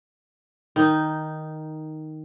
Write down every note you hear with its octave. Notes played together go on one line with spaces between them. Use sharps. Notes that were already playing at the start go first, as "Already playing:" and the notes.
D#3 D#4